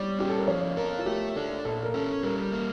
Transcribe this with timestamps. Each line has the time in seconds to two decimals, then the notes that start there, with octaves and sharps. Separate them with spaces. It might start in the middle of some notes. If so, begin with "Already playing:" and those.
Already playing: G3 C#5 D5
0.19 C#4 G4
0.30 A4
0.38 A#4
0.47 F3 C#5
0.77 A4 A#4
0.99 F4
1.06 A3 G4
1.36 D4 A4
1.65 A#2 A4
1.84 A#4
1.94 C#4 A4
2.23 G3 A#4
2.52 A#3